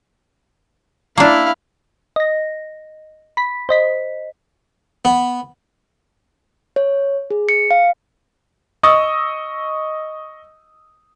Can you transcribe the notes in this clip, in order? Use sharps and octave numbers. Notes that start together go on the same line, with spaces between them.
A#3 D4 E4 F5
D#5 A#6
B5 B6
C5 D#5 B6
B3
C#5
G#4
C#7
F5
D#5 C#6 D#6 E6